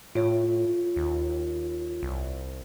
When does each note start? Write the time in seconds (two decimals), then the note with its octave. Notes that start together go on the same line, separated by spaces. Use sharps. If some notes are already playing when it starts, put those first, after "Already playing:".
0.15 A2 F4 C#5
0.96 D#2
2.03 C2